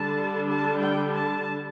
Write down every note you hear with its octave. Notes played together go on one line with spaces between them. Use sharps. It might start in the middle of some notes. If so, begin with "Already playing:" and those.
Already playing: D3 G3 D4 A5
A5
G5
A5